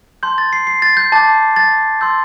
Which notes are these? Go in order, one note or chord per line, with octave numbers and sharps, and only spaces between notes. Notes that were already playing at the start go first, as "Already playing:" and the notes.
A5 C6 G6
A6
C7
C7
A6
G6
A5 D6 G6 A6
A6
C6 E6 G6